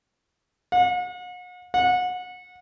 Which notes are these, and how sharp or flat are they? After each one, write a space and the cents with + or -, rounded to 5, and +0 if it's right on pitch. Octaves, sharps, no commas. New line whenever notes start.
F#5 -45
F#5 -30